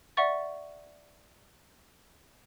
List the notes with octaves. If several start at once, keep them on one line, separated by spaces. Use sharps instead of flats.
D5 E5 F#5 C#6 A6